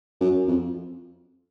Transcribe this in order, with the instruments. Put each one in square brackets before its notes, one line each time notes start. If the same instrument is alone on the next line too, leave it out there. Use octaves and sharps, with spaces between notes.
[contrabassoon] F#2
F2